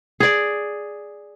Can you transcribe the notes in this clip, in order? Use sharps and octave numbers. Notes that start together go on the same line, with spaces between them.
G#4 D5